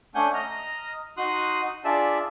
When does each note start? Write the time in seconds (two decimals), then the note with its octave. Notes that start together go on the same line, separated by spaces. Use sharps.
0.15 A3 C#4 D4 F#5 G#5 G6
0.34 D#5 A#5 F6
1.17 D#4 F#4 C6 D#6 F#6
1.85 D4 F4 G#4 D5 E5 A5